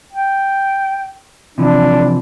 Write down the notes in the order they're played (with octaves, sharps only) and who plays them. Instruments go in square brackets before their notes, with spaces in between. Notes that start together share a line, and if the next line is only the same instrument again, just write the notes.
[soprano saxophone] G5
[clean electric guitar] C3 E3 F3 [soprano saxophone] D4